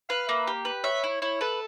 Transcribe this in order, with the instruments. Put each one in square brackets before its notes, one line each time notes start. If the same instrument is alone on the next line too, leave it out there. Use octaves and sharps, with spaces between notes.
[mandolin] B4 [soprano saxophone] F5
[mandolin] A#3 [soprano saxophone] E5
[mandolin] G4
B4
[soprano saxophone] C#5 [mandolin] E5
[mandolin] E4
[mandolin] E4 [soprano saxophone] C#5
[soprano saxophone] A4 [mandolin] B4